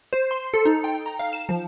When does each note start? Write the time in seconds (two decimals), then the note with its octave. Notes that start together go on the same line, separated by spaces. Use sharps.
0.13 C5
0.31 C6
0.54 A4
0.65 D#4
0.84 G5
1.06 A#5
1.19 F5
1.33 E7
1.49 F3